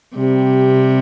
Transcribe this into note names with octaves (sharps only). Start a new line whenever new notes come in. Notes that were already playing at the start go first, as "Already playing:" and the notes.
C3 G3 C4 G4